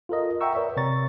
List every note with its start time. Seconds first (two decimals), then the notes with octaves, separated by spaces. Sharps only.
0.09 F4 A4 A#4 D#5
0.41 E5 F#5 G5 A#5 C#6 E6
0.55 A#4 B4 C#5 D5 E5
0.77 C3 C#5 A#5 C#6 A6